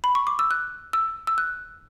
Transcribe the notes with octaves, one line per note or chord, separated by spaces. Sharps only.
B5
C#6
D6
E6
F#6
E6
E6
F#6